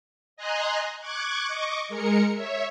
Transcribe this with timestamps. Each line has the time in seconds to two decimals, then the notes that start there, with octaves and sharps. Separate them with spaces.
0.37 D#5 G#5 A#5 C6 F#6
1.01 C#6 D6 F#6 G#6
1.48 D#5 C#6 D6
1.89 G#3 A#4 C#7
2.34 C#5 E5